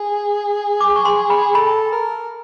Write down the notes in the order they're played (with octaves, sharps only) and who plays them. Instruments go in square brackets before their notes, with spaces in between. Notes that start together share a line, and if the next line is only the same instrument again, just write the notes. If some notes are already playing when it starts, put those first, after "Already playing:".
Already playing: [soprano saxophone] G#4
[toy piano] D6
C#6
C6
B5
[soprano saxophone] A4 [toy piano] B5
[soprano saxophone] A#4